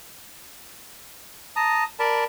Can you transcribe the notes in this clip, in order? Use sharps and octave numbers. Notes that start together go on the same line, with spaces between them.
A5 A#5 D#6
A#4 D5 A5 B5